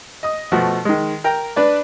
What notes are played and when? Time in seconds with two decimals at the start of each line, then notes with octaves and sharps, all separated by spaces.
0.23 D#5 D#6
0.52 B2 F3 A3 F#4
0.85 D#3 G#3
1.24 A#4 G5 A#5
1.56 D4 B4 D5